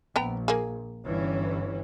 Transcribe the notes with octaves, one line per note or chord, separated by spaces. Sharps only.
A#1 B3 G5 A#5
A#3 G#4
G1 E3 C#4